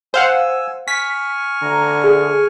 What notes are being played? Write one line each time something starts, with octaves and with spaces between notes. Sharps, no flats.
C5 F5 F#5 G#5 E6
G#5 C#6 F6 B6
D3 A#5
G#4